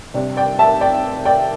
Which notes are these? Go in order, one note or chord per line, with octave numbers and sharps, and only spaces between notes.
C3 G3 D4
D5 G5
E5 A5
D5 G5
D5 G5